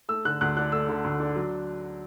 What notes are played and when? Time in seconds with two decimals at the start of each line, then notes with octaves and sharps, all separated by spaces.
0.08 A3 E6
0.25 D3 F#6
0.41 D2 F#6
0.57 D4 F#6
0.72 A3 E6
0.89 D3
1.04 D2
1.20 D4
1.35 F#3